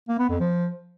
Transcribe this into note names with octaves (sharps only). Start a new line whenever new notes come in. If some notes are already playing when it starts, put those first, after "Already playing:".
A#3
B3
F2
F3